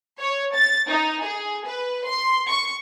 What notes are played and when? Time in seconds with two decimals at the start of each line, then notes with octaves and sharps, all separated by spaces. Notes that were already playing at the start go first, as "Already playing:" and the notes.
0.19 C#5
0.54 A6
0.88 D#4
1.24 G#4
1.66 B4
2.07 C6
2.49 C#6